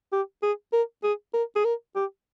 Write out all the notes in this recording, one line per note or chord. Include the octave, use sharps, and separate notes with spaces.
G4
G#4
A#4
G#4
A#4
G#4
A#4
G4